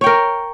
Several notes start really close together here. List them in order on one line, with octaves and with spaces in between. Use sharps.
C#5 G5 A#4